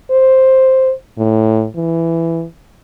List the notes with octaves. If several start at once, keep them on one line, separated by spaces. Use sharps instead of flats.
C5
A2
E3